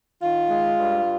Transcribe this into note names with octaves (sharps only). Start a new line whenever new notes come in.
D#3 F4
G#3
G2